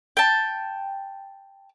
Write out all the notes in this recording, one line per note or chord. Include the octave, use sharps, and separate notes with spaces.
G5 A5